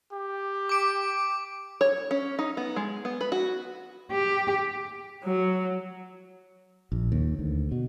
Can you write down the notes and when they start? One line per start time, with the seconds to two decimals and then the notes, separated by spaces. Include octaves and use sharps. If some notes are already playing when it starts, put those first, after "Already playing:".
0.12 G4
0.69 D6 D7
1.81 C#5
2.11 C#4
2.39 D#4
2.57 B3
2.76 G#3
3.05 B3
3.21 B4
3.32 F#4
4.12 G4
5.24 F#3
6.92 A#1
7.12 D#2
7.39 D2
7.72 B2